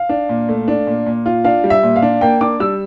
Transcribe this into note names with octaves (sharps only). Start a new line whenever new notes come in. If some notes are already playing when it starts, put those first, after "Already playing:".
Already playing: F5
D4
A#2
A3
D4
A#2
A#2
F4
D4 F5
G3
E5
A#2
F5
D4
A#3 G5
D4 D6
G3 E6